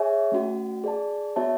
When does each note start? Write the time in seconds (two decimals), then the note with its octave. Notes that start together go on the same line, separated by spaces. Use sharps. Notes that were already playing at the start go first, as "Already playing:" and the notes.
Already playing: G#4 C#5 E5 G#5
0.32 A3 C#4 F#4
0.84 G#4 D5 A5
1.36 B3 F#4 C#5 E5 A5